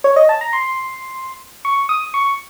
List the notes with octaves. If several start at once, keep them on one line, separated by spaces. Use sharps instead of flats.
C#5
D#5
A5
A#5
C6
C#6
D#6
C#6